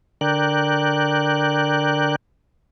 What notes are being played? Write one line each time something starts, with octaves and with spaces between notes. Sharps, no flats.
D3 A#4 D5 G5 F#6